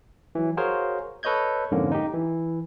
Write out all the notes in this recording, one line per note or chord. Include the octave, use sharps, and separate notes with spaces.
E3 F#3
F#4 G#4 A#4 C5 C#5 F5
A4 B4 C#5 D#5 G6 G#6
F2 G#2 D3 A#3 C#4
D#4 G4
E3